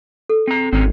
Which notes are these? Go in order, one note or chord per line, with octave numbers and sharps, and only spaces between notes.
A4
C4 A#5
G#1 C4 C#4 A#5